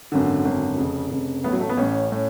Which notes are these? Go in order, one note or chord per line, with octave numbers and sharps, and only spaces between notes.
G#1 F#2 D3
G#1 F#2 D3
F1 F2 C#3
F1 F2 C#3
A1 A2 B3
F#3
A3
B3
A1 A2 C#4
A2